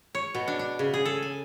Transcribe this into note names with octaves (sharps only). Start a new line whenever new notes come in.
C#5
B2
D4
D4
C#3
G#4
A4
G#5